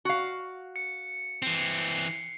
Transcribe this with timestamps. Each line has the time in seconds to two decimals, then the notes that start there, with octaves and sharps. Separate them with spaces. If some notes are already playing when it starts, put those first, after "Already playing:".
0.05 F#4 F5
0.76 C#7
1.42 E3 C4 C7